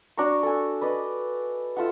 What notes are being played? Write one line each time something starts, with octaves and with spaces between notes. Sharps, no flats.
D4 F#4 A#5 C#6
A4 G#5
B4 D5 D#5
F4 A4 E5 F#5